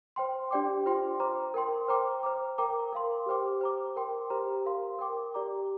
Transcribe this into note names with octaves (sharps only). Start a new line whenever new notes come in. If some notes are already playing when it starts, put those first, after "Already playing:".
C5 G5 C6
D4 G4 D5 G5 D6
F4 C5 G5 C6
C5 A#5 D6
A#4 G5 C6
C5 G5 A#5 D6
C5 A#5 D6
A#4 G5 A#5 D6
A#4 F5 C6
G4 C5 G5 D6
C5 A#5 D6
A#4 G5 C6
G4 C5 A#5
A#4 F5 C6
A#4 G5 D6
G4 D5 A#5 D6